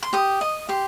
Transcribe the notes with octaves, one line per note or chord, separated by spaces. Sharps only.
C6
G4 D#6
D#5
G4 C6